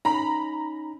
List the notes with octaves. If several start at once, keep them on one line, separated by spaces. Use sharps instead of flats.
C#4 D#4 A#5 B5